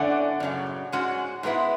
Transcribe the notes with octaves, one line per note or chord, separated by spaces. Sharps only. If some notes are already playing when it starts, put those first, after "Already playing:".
Already playing: D3 A3 C#4 D5 F#5
F#2 C#3 F#3
G#2 G#3 C#4 F#4
G#2 G#3 B3 E4